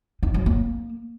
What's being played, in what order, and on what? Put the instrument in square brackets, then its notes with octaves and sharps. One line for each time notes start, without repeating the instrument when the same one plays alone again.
[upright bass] D#4
F#3
A#3